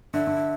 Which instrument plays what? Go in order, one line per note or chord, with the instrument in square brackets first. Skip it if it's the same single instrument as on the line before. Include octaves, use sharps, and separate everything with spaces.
[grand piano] D3 [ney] E5
[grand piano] D3